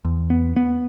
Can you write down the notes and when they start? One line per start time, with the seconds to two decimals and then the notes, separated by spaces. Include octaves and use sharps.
0.05 E2
0.30 B3
0.56 B3